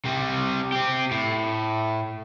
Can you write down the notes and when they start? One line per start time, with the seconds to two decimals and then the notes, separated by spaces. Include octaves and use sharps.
0.05 C3 G3
0.72 C4 G4
1.11 A2